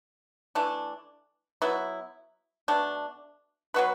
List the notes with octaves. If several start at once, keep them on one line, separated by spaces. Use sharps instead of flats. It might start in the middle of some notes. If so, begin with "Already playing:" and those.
E3 A3 D4
F#3 B3 E4
B2 A3 D4
F#3 B3 F#4 B4